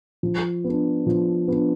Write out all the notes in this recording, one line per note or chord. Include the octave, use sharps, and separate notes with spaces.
F3
B3 D4
F3
B3 D4